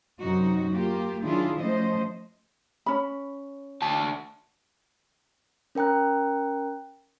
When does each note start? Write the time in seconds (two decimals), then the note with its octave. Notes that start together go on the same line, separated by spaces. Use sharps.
0.21 F#2 C3 D#4 F#4
0.73 A#3 F4 G4
1.22 D#3 F#3 D4 E4 F4 G#4
1.60 F3 A3 C#4 C5 D#5
2.86 C#4 B5
3.82 D2 A5
5.75 C#4 A#4 G5 A#5 F#6